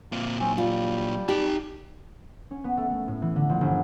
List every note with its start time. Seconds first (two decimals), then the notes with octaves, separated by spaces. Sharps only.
0.12 A#2 C4 F5 D6
0.39 A#2 F#3 C4 C#4
0.58 G3 F4
1.29 D#4 G4 A5
2.51 C#4
2.64 B3
2.77 A3
2.90 A3
3.08 A2
3.22 E3
3.36 D3
3.49 A#1
3.61 G1